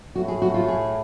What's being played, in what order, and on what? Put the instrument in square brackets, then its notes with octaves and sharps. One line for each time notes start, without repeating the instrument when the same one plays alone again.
[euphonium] A2 [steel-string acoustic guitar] F#4
[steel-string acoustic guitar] G#4
F#4
F4
G#4